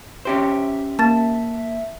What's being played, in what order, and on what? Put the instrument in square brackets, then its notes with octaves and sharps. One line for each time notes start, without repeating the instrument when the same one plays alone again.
[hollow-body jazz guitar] C#4 G4 C5 [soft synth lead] E5
[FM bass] A#3 [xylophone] A5 A6